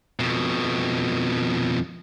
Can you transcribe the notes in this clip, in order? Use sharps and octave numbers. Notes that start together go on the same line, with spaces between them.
F2 B2